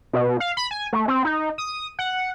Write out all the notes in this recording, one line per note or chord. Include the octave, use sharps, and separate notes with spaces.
B2
F5
B5
G#5
A3
C4
D#4
D#6
F#5